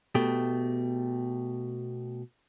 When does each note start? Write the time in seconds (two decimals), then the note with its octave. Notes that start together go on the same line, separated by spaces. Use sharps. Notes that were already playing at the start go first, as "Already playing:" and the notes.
0.15 B2 A3 G4